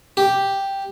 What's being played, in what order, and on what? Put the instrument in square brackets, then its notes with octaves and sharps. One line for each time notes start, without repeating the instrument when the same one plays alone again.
[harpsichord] G4